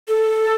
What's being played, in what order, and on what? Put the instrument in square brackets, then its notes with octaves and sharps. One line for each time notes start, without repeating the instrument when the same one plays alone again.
[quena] A4